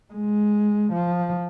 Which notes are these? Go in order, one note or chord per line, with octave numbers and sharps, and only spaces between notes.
G#3
F3